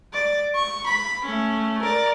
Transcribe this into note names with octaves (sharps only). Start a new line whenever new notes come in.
D5
C#6
B5
A3 C#4
A#4 D5